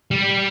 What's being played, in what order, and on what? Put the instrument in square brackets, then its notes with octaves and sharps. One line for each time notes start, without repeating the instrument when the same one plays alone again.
[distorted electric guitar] G3